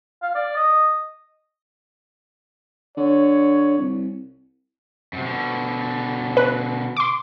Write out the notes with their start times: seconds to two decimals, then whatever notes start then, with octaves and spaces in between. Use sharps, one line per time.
0.23 F5
0.35 D5
0.56 D#5
2.97 D3 C#5
3.78 C2
5.13 F#2 C3
5.26 B2 D3
6.37 B4
6.97 C6 D6